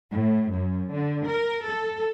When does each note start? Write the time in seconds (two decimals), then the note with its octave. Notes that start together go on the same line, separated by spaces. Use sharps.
0.12 A2
0.53 F#2
0.93 D3
1.27 A#4
1.67 A4